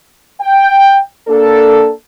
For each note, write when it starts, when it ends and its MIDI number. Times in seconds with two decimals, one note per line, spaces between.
0.41 1.02 79
1.28 1.91 58
1.28 1.91 62
1.28 1.91 69